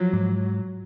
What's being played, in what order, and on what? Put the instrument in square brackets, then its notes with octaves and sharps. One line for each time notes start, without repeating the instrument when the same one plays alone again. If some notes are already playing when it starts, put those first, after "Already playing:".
Already playing: [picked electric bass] F3 [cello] F#3
[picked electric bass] G#2